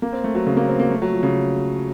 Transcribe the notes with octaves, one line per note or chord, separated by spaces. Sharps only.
A#3
C4
A3
F#3
C#3
A#3
C4
A#3
A3
F#3
F3
C#3